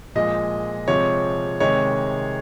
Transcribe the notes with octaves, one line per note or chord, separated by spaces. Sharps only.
A#2 F3 G#3 D#5
C3 F3 G#3 C#5
C3 D#3 G#3 C#5